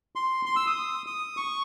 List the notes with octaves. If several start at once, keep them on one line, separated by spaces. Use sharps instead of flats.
C6
C6
E6
D#6
D#6
C#6